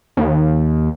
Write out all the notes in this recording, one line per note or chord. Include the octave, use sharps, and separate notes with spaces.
D#2